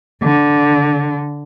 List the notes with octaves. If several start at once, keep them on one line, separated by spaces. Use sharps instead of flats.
D3